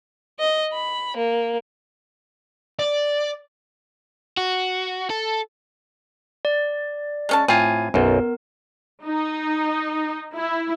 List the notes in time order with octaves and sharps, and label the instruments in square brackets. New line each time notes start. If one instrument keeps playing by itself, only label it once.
[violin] D#5
B5
A#3
[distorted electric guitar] D5
[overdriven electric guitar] F#4
A4
[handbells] D5
[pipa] G#3 C#4 A5
[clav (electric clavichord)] A2 F4 [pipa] C4 [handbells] G#5 G#6
[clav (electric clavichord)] B1 F#2 [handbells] B3 A#4
[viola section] D#4
E4